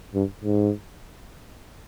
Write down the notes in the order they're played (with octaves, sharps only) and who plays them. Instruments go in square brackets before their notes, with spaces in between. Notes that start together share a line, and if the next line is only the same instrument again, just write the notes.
[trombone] G2
G#2